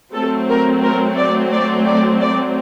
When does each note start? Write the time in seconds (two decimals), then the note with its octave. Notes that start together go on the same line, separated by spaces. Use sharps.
0.13 F#3 A3 C4 A4
0.49 A#4
0.82 A#4
1.17 D5
1.52 D5
1.86 D5
2.20 D5